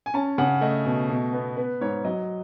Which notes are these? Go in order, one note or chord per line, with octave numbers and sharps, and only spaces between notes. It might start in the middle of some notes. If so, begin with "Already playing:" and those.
G#5
C#4 A5
C#3 F#5
A3 D#5
B2
B2
B3
B3 B4
G#2 C#5
F#3 D#5